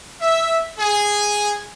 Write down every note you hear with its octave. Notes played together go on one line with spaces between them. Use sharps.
E5
G#4